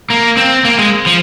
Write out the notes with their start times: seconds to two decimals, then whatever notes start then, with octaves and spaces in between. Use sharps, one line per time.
0.10 A#3
0.37 C4
0.65 A#3
0.79 G#3
1.06 F3